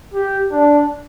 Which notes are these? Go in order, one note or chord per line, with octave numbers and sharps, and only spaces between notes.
G4
D4